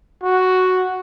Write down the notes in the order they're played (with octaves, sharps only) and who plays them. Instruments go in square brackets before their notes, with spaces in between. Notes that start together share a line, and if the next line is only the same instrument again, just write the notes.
[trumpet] F#4